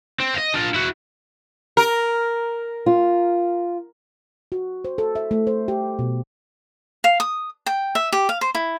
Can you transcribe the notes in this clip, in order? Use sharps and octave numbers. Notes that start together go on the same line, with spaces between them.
C4
D#5 F5
D4 F4
E4 F#4
A#4
F4
F#4
C5
A4
E5
A3
C5
G4
B2
F5
D#6
G5
E5
G4
F5
C5
E4